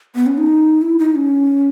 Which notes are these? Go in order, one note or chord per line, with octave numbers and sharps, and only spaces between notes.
B3
C#4
D#4
E4
D#4
C#4